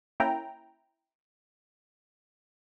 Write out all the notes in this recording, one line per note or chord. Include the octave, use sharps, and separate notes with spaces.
A#3 C#4 E4 G5 A#5